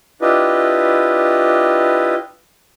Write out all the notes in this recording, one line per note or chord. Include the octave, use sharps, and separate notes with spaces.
D4 E4 F4 G4 B4 D#5